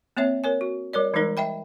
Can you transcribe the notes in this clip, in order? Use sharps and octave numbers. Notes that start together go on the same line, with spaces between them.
A#3 C4 C#5 E5
A#4 C#5 G#5
F#4
G3 A#4 C#5 D5
E3 G3 G#3 D#4 A#4
D#5 E5 G5 B5